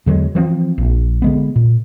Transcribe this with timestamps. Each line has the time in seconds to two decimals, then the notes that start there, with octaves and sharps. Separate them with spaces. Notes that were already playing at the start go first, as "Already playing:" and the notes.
0.06 E2 D3 F#3 G#3
0.35 E3 F3 A3 C4
0.78 A#1
1.22 D3 G#3 B3
1.56 A#2